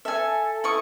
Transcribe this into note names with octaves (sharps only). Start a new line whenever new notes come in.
A4 E5 G#5
E4 D#5 C#6